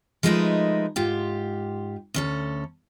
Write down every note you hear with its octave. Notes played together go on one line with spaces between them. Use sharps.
F3 G#3 A3 D#4 A#4 B4
G#2 F4 G4
D2 C#4 A4